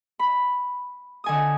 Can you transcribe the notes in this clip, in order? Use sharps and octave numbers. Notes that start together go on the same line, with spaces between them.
B5
D3 G#5 D#6